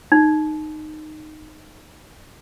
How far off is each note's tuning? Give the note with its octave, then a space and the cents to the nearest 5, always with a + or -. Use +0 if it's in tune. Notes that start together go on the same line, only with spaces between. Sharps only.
D#4 -15